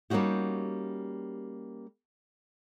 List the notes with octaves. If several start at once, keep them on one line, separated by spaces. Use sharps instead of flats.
G3 A#3 C#4 D#4 F#4 G4